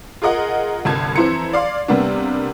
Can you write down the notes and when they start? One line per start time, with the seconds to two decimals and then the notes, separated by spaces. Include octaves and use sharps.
0.22 F4 G#4 A#4 D#5 F#5
0.85 G1 C2 A5 G#6
1.16 F2 E3 E4 C5 A#5 C#7
1.53 D5 F5 C6
1.88 C3 G3 A#3 B3 D4